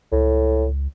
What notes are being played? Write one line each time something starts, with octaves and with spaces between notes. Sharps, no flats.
C#2 A2